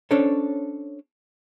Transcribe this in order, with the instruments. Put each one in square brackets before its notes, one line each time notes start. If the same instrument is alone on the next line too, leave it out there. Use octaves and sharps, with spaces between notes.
[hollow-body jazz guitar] C#4 D4 A4 C5 C#5